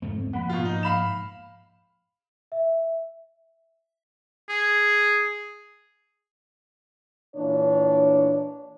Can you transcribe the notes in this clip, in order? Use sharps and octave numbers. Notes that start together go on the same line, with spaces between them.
F2 G#2 D3 A3 C4
F3 A#3 F#5 B5
G#2 B2 F4
D#4
F5 B5 E7
E5
G#4
A#2 E3 D4 C#5